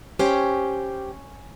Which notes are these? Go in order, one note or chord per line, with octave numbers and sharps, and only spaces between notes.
C#4 G4 C5 G5